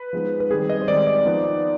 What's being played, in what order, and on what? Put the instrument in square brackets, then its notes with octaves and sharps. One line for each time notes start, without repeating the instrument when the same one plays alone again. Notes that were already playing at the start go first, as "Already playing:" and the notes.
Already playing: [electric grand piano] B4
F3 G#3 B3 D#4
B4
D#3 G3 C4 G#4
D#5
C5
D#3 G#3 C4 D5
D5
F3 B3 D#4